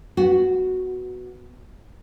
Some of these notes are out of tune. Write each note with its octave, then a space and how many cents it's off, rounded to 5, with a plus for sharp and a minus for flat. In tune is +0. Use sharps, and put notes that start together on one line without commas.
B3 +0 F#4 +0